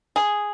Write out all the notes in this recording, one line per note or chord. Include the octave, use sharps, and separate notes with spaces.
G#4